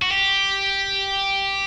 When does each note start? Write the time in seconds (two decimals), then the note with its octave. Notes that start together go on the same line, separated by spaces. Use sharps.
0.02 F#4
0.11 G4